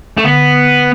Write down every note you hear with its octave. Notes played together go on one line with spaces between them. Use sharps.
A3
D3 B3